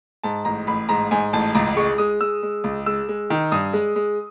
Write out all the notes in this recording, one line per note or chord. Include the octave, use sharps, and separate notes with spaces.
G#2 A5
A1 A#5
A1 B5
G#2 A#5
G#2 G#5
A1 A5
C#2 A#5
G#3 C#6
G#3 D#6
G#3 E6
G#3
C#2
G#3 E6
G#3
D#3
G2 D#6
G#3
G#3